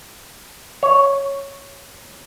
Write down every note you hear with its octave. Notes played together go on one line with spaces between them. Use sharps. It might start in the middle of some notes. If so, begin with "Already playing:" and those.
C#5